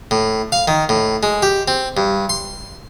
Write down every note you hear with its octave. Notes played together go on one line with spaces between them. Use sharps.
A2
F5
D#3
A2
G#3
G4
C4
G2
C6